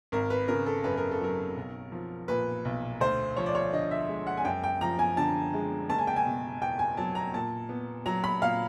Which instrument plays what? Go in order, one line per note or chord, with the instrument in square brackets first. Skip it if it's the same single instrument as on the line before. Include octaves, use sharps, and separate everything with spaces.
[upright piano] G#1 A#4
B4
C#3 A#4
A4
F#2 B4
A#4
A4
F#3 A#4
B1
F3
A#2 B4
B1
D2 C5
F3 C#5
D5
C#5
D3 D#5
E5
G#3
F#5
G#5
F#2 G5
G5
F3 A#5
G#5
D3 A5
G#3
F#1 A5
G#5
G5
G#5
B2
E2 G5
G#5
F#3 A5
A#5
A#2 A5
B3
F#3 A#5
B5
A#2 F5